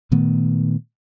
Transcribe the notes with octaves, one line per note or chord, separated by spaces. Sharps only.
A#2 D#3 A3 B3